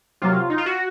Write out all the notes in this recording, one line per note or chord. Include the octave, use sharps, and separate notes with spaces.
C3 F#3 A#3 F4
D#4
F4
F#4